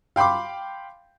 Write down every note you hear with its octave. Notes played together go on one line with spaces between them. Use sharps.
F5 G5 B5 C6 D6